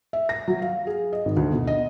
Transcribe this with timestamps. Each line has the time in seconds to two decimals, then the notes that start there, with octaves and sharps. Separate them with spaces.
0.13 E5
0.29 A#6
0.48 F#3
0.62 F5
0.87 G#4
1.13 D#5
1.25 G#1
1.37 D2
1.52 B2
1.67 D#5